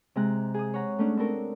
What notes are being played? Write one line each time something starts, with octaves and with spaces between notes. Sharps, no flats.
C3 G#3 A#5 F#6
G#4 D#6
C#5 F#5 A#5
A3 C#4 D4
C4 D4 A4 A#4